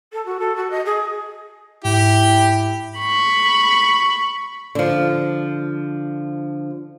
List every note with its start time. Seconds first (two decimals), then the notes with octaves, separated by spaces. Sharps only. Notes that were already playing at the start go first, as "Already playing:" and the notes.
0.12 A4
0.25 F#4
0.39 A4
0.56 F#4
0.70 D#5
0.85 G#4
1.84 G#2 E4 G4
2.99 B5 C#6
4.75 D3 F3